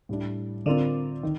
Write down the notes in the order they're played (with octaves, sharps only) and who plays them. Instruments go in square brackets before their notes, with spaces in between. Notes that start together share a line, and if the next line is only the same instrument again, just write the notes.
[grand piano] A2 G3 D4
[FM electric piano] D3 [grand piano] C4 F4 A#4 D5
[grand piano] D#3